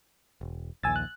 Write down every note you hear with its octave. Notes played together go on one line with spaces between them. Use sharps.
E1
A#1 D#2 G#5 E6 A6
F#6